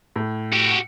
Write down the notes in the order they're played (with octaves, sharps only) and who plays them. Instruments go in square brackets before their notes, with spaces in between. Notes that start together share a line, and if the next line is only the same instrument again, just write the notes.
[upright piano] A2
[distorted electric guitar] F#4 G4